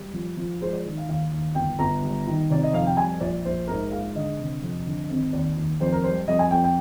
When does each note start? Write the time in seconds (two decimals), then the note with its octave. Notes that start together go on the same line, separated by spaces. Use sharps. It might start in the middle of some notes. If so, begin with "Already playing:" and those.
Already playing: G3
0.13 F3
0.37 F3
0.62 G#3 C5
0.73 D5
0.85 D#3
0.97 F5
1.08 D#2 F5
1.31 D#2
1.55 G1 G5
1.79 G1 A#5
2.02 G3
2.27 D#3
2.50 C3 D5
2.63 D#5
2.73 F2 F5
2.86 G5
2.97 G3 G#5
3.21 A#1 D5
3.45 A#1 C5
3.68 G#2 A#4
3.91 G#3 F5
4.15 D3 D#5
4.40 C3
4.63 F2
4.86 D3
5.10 G#1
5.33 D#2 D5
5.57 D#2
5.81 F2 C5
5.92 A#4
6.04 G3 C5
6.28 F2 D#5
6.39 G#5
6.51 F2 G5
6.64 G5